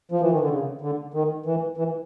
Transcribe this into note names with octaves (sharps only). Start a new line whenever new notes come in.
F3
E3
D#3
D3
C#3
D3
D#3
E3
E3